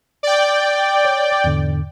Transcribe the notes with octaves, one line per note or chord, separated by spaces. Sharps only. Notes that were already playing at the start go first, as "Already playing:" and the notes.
D5 G5
C#5
E2 G#2 D3